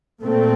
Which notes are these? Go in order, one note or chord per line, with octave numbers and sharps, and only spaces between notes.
A#2 A3 C4